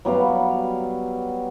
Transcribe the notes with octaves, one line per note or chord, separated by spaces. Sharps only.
F#3 G3 B3 F5